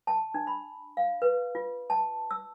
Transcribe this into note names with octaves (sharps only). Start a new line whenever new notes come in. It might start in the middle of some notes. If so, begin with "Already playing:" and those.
A5
D4
B5
F5
B4
F4
A5
E6